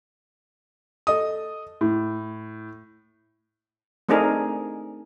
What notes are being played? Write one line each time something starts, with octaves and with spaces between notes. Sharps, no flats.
A4 D#5 D#6
A2
A3 C4 D4 D#4 G#4 A#4